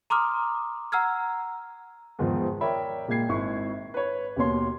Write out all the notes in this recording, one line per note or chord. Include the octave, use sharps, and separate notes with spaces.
A#5 C6 D6 D#6 F6
F#5 A#5 E6 F6 G#6
E2 G#2 D#3 F3
A#4 C#5 D5 E5 G5 B5
A#2 G#3 A#3 G5 G#6 C7
G#1 E4 C#6
B4 C#5
D#2 B2 A#3 C#5 C6